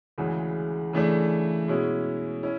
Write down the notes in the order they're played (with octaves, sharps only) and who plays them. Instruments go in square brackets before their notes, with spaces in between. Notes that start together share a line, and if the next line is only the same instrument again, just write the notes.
[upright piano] D2 C#3 E3 G#3
C#3 E3 A3 D4
B2 G#3 C#4 E4
C#4 E4